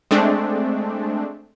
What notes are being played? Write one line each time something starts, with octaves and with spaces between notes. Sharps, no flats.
G#3 A3 C4 D4